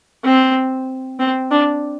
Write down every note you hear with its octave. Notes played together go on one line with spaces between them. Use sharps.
C4
C4
D4